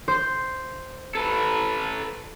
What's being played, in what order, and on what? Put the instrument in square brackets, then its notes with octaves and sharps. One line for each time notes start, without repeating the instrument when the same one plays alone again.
[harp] C5
[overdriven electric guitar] A4 B4